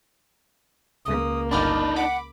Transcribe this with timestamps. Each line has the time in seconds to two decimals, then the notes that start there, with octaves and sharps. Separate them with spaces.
1.05 C#2 A#3 D#6
1.51 G1 D4 D#4 D5 B5 F6
1.96 F#5 B5 D6